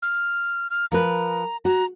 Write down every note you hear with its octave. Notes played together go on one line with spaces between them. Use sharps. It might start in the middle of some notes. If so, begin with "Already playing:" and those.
F6
F6
F3 A#4 B4 A#5
F#4 A#5